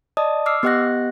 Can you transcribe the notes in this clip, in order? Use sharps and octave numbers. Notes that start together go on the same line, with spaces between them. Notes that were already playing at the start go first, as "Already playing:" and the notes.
D5 D#5 A5 D#6
D6 E6 F6 C7
B3 G4 D#5 F#5 F#6 A#6